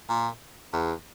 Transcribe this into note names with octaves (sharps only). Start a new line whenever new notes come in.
A#2
E2